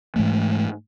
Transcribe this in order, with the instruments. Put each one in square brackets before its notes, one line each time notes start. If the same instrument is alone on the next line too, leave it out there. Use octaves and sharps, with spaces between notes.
[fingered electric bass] G#2 E3 G#3 A3